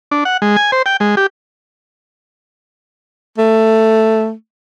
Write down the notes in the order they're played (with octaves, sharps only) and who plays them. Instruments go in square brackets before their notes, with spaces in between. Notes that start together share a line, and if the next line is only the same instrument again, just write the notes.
[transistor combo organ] D4
F#5
G#3
G#5
C5
G5
G#3
G4
[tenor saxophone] A3